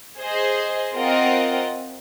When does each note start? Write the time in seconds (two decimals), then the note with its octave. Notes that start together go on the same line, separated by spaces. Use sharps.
0.19 G#4 C5 D#5
0.95 C4 F4 A#4 D#5 F#5